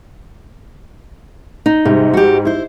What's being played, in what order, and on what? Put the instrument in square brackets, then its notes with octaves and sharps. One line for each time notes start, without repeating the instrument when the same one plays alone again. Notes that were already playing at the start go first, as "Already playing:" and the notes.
[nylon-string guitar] D#4
[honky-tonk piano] G#2 G3 [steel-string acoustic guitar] C3
[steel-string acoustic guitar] F#4 G4
E4 C5